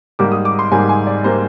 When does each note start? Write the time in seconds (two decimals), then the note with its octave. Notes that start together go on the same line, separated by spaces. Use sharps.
0.19 G#2 G3 A#3 D6
0.32 D#6
0.45 D6
0.59 C6
0.72 G#2 G3 A#3 G#5
0.89 G#5
1.07 D5
1.24 G3 A#3 C5